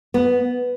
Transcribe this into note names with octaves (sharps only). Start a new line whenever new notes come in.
B3